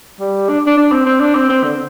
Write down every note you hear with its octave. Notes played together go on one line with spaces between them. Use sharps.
G3
D4
D4
D4
C4
C4
D4
C4
C4
D3